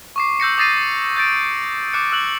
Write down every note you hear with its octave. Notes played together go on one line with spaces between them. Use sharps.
C#6 D6 C7
E6 G6 A#6 C#7
D6 D#6 A6 A#6 C7 D#7
G6 A6 D7
D6 F#6 C#7
E6 F#6 F#7